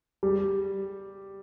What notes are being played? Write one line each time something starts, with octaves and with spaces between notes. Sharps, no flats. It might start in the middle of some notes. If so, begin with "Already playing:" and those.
G3